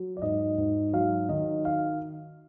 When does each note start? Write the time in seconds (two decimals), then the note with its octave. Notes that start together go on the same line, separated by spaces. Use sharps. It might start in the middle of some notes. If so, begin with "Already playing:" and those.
Already playing: F#3
0.17 D5
0.22 G#2 D#5
0.58 G#2
0.93 F#3 F5
1.29 D#3 D#5
1.65 F5